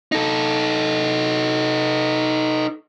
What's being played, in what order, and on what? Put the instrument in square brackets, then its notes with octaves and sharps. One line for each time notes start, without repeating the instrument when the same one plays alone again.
[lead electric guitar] D#4 A4